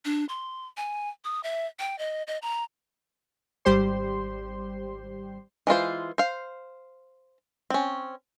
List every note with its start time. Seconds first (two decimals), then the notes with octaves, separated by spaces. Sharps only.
0.05 D4
0.29 C6
0.77 G#5
1.24 D#6
1.44 E5
1.79 G5
1.99 D#5
2.27 D#5
2.42 A#5
3.65 G#1 G3 G4 C5 C6
5.67 E3 G#3 F4 C5
6.18 C5 F5
7.70 C4 C#4